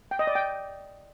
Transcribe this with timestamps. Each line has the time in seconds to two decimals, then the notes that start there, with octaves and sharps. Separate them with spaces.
0.11 G5
0.19 D#5
0.27 D5
0.35 G5